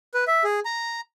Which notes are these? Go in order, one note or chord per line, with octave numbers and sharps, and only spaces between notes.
B4
E5
G#4
A#5